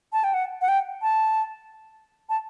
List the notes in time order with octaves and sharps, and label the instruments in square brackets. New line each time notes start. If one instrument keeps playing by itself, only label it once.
[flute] A5
G5
F#5
F#5
G5
A5
A5